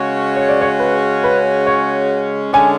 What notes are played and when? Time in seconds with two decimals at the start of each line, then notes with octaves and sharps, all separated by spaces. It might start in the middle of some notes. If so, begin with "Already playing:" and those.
Already playing: C#3 G#3 C#4 F#4
0.37 C#5
0.49 D5
0.61 C#5
0.80 B4
1.24 B4
1.67 C#5
2.53 D3 G#3 C#4 G#5